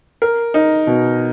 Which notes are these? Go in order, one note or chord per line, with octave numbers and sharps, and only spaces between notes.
A#4
D#4
B2